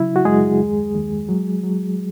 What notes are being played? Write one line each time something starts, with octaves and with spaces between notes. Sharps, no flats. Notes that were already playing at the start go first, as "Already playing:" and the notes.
Already playing: C#3 F#3 E4
F#4
F#2 G#3 G#4
D#2
D#2
F#3
F#3